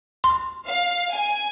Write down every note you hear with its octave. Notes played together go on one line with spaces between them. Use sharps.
C6
F5
G#5